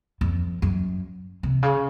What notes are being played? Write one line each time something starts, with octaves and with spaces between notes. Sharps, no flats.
F2
F#2
C3
C#3